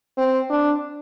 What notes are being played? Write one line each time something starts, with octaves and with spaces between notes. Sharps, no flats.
C4
D4